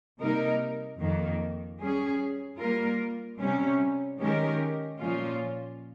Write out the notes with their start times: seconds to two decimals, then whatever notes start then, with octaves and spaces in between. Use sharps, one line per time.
0.19 C3 G3 A#3 D#4 A#4
0.99 F2 D#3 A#3
1.80 G3 C#4 G#4
2.59 G3 A#3 F4 A#4
3.40 C3 G3 C#4
4.20 D#3 G#3 C#4 G4 A#4
5.01 A#2 F3 A#3 C#4 F4